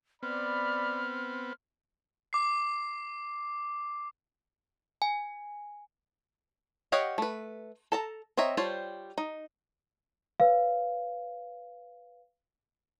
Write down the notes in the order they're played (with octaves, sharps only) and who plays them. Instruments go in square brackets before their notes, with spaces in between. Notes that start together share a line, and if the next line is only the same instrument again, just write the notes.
[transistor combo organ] B3 C4 [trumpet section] D5 B5 [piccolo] F6
[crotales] D6 C7
[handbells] G#5
[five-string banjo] G4 C#5 D#5 F5 F#5
A3 B4
A4 A5 A#5
C4 C#5 D#5 E5 A#5
G3 F4 C5 C#5 A5
D#4
[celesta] B4 C#5 F5